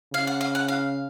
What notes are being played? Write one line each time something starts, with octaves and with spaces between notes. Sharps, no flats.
C#3 F5
F#5
F5
F#5
F5